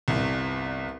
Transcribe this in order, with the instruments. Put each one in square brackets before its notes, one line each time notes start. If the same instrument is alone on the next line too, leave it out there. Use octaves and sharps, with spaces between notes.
[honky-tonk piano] G1 C2